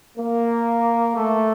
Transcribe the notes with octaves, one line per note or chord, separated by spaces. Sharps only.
A#3
A3